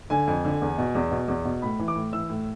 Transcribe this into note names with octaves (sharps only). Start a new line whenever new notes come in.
D3 G#5
F2
D3
E2
B2
E2
B2
E2
B2
A2 B5
E3
D6
A2
E3 E6
A2